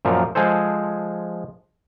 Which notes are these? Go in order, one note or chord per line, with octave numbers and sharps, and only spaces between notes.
F#2 A#2 F3 A#4
F3 G#3 G#4 A4 C5